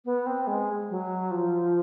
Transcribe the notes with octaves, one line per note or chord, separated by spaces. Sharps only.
B3
C4
G#3
F#3
F3